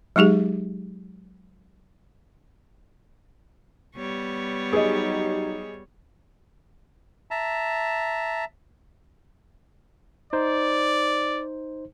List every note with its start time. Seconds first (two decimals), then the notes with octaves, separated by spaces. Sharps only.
0.16 F#3 G#3 D#4 G4 G#4
3.96 G3 B3 C#5
4.73 F#3 D#4 G4 G#4 D#5
7.31 E5 A5 A#5
10.33 D#4 C5 D5